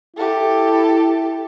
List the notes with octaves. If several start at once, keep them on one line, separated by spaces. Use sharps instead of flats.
E4 G4 A4